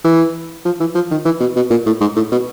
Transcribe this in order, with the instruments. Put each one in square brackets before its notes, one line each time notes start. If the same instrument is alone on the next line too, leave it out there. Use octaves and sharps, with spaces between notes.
[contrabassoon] E3
F3
E3
F3
D#3
E3
B2
B2
A#2
A2
G#2
A2
B2